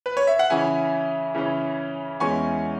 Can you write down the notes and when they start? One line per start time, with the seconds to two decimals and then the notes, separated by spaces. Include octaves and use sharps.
0.06 B4
0.17 C#5
0.27 E5
0.39 F#5
0.50 C#3 E3 C#4 E4 E5 G#5
1.34 C#3 E3 C#4 E4
2.20 E2 E3 G#3 C#4 E4 G#5 C#6